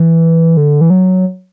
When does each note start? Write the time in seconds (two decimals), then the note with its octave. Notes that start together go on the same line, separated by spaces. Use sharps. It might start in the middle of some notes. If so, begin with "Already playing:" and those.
Already playing: E3
0.57 D3
0.81 E3
0.90 F#3